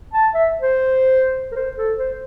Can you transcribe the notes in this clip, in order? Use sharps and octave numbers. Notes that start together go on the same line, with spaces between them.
A5
E5
C5
A#4
C5
A4
C5